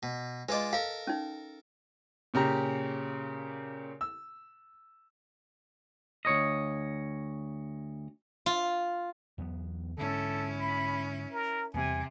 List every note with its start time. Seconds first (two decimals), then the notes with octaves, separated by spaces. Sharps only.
0.03 B2
0.49 G#3 F4 B4 D5 D#5
0.73 A4 A#4 F5
1.07 C#4 D#4
2.34 A#2 C#3 G4 A#5
4.01 E6
6.25 D2 C#5 D#5
8.46 F4
9.38 E2 F#3 B3
9.98 G#2 D3 C#4 E4 A4
10.58 B5
11.32 A#4
11.74 E2 C3 G3 G#5